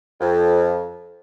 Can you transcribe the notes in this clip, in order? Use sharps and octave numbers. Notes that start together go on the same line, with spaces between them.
F2